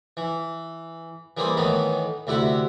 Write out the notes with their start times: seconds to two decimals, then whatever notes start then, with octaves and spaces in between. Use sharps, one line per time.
0.17 E3
1.37 E3 G3 A#3 G#4 C5
1.57 A2 D#3 E3 B3 D#4
2.27 D2 C3 E4 G4 F#5